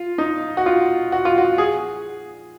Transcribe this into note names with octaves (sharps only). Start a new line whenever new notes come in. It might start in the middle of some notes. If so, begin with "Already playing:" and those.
Already playing: F4
D#4
F#4
F4
F#4
F4
F#4
G#4